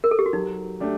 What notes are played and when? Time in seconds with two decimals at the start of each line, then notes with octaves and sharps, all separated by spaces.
0.04 A#4
0.11 A4
0.19 G4
0.26 F#4
0.33 F#3 D#4
0.80 A3 D4 G4